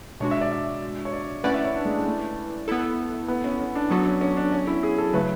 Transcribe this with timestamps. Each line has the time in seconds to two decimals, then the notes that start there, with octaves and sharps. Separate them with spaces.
0.20 B2 G#3 D4 F#4 C#5
0.31 E5
0.41 D5
0.52 E5
1.05 C#5
1.13 D5
1.44 A3 C#4 E4 B4 D5 F#5
1.54 E5
1.64 C#5
1.75 D4
1.85 G#3
1.95 A3
2.06 A3
2.68 B3 E4 A4
3.28 B3
3.44 C#4
3.60 C#4
3.75 D4
3.90 F#3 B3 D4 F#4 A4
4.06 C#4
4.21 C#4
4.37 D4
4.52 C#4
4.67 E4
4.83 G#4
4.98 A4
5.13 C#3 F#3 A3 B4